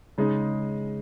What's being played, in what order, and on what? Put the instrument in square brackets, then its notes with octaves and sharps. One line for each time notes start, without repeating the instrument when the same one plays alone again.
[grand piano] C#3 G#3 D#4